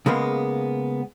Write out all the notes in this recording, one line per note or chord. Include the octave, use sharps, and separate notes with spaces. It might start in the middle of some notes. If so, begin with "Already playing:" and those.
C#3 G#3 A#3 B3